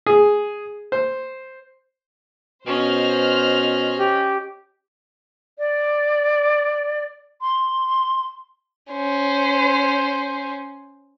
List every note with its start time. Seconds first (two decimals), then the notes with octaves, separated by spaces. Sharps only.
0.06 G#4
0.92 C5
2.66 B2 C#4 C5 D#5 F6
3.97 G4
5.59 D5
7.41 C6
8.92 C#4 C5